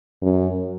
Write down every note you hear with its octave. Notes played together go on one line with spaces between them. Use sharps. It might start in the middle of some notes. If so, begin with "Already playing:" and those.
F#2